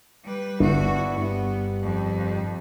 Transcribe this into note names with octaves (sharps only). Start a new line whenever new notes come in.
G3 B4
G1 B3 D4 E4 F#4
G2 B3
F2